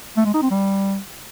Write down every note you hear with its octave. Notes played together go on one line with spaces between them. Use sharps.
A3
G#3
D#4
C4
G3